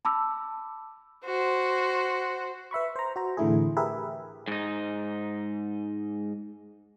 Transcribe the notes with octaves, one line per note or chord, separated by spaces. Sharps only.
A5 B5 D6 E6
F#4 C5
B4 E5 B5 C#6
C5 A#5
F#4 C5 A#5
A2 D3 E3 A3 E4 G#4
G4 G#4 A#4 B4 E5
G#2 D#4